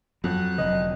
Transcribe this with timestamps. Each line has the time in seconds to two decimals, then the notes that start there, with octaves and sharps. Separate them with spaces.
0.24 F2 F#3 F#6
0.58 F1 D3 F#3 D#5